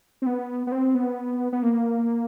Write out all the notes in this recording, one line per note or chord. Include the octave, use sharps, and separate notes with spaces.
C4
B3
B3
C4
B3
B3
A#3